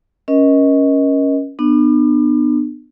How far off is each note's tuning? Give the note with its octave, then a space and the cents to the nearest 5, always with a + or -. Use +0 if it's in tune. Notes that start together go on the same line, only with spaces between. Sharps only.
C#4 +0 A#4 +35 D#5 +15
B3 +0 D4 +40